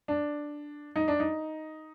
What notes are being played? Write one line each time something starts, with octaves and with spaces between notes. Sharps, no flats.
D4
D#4
D4
D#4